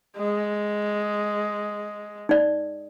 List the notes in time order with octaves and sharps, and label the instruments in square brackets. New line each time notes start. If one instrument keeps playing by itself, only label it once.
[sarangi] G#3
[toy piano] D#4 D5